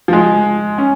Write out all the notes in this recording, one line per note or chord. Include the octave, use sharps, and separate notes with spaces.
F3
G#3
C#4